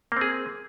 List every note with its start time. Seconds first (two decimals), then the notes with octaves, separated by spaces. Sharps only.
0.12 A#3
0.17 C4
0.21 G#4